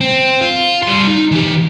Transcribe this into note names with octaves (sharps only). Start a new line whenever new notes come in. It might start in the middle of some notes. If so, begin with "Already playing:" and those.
C4
F4
G3 C6
D#4
E3 G4